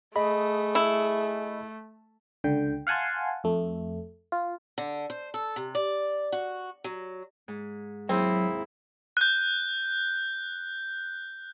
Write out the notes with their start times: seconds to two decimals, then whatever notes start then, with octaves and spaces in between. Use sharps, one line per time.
0.16 A3 G#4 D#5 B5
0.75 E4
2.44 C#2 D3 G5
2.87 F5 F#5 G#5 A5 C6
3.44 F2 A3
4.32 F4
4.78 D3
5.10 C5
5.34 A4
5.56 C3
5.75 D5
6.32 F#4
6.84 F#3
7.48 G#2
8.09 D#2 F#3 C4 E4 G#4 A#5
9.17 F#6 G6